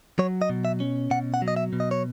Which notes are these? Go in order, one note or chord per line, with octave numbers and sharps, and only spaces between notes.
F#3 C#5
D#5
B2
E5
C#4
B2 F#5
F#5
F#3
D#5
E5
B2
D#5
C#5